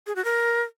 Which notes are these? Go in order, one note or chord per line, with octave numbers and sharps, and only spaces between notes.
G#4
F#4
A#4